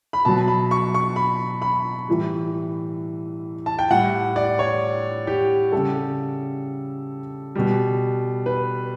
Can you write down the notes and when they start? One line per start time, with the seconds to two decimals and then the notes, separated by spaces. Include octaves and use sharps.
0.13 B5
0.25 B2 F#3 A5
0.48 B5
0.71 C#6
0.94 C#6
1.16 B5
1.62 B5
2.08 A2 E3 G3
3.66 A5
3.79 G5
3.90 A2 G3 F#5
4.36 D5
4.59 C#5
5.27 G4
5.72 C#3 G3 A4
7.55 B2 G3
8.46 B4